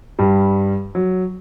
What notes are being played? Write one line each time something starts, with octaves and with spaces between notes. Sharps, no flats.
G2 G3
F#3